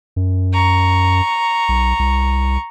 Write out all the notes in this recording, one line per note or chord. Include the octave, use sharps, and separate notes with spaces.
F#2
A#5 C#6
B1
C2